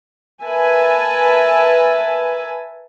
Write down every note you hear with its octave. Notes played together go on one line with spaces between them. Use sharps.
A#4 B4 E5 G#5 A5